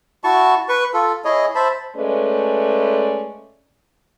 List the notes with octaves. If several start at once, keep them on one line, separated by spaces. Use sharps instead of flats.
E4 F#4 A5 C#6
B4 C#6
F4 A4
E4 G#4 C#5 D#5
C5 E5 A5 B5
G#3 A3 C#4 B4 D5